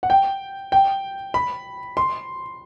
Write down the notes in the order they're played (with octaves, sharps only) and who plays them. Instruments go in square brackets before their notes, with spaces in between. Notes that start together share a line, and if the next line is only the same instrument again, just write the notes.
[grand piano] F#5
G5
G5
B5
C6